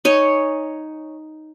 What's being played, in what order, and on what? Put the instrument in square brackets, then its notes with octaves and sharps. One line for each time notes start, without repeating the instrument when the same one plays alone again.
[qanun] D#4 C#5 G#5